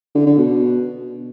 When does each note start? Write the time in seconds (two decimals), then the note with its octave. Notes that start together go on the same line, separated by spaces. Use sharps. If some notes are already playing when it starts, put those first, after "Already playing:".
0.15 D3
0.26 D3
0.38 B2